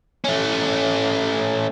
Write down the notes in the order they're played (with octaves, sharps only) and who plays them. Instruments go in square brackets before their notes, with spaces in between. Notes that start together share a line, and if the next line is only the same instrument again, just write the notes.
[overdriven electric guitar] A3 C#4